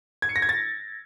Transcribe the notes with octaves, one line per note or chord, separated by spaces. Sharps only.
G#6
C#7
A#6
G#6
A6